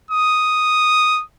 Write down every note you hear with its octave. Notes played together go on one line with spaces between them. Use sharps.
D#6